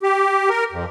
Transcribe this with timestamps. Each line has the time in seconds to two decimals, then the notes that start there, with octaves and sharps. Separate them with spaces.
0.03 G4
0.50 A#4
0.72 F2